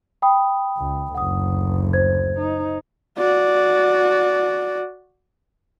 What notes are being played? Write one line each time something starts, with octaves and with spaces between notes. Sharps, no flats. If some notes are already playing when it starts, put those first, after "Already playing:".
G5 B5 D#6
C#2
F#1 D2 F#5 D#6
C5 G#6
D#4
F#4 D5